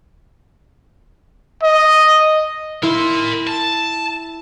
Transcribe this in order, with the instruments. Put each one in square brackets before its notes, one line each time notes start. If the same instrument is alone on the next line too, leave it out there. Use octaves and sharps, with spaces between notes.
[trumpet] D#5
[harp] E4 [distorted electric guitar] A#4 C6
[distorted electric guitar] A5